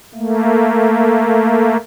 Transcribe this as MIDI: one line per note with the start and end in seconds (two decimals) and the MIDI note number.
0.15 1.77 57
0.15 1.77 58